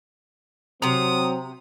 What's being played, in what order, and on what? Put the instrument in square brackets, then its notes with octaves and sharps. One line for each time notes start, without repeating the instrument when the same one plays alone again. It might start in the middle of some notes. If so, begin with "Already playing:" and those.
[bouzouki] C3 A#5 [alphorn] F#3 [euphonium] C4 [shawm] D#6